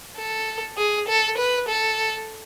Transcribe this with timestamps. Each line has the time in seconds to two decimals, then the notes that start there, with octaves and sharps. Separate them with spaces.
0.17 A4
0.77 G#4
1.08 A4
1.38 B4
1.68 A4